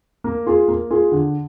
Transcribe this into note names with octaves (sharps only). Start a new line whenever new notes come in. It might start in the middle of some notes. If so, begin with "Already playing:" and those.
A#3
F4 G#4
A#3
F4 G#4
D3